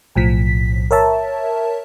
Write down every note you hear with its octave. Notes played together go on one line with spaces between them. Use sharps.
B1 A2 F3 B6
A#4 C#5 E5 A5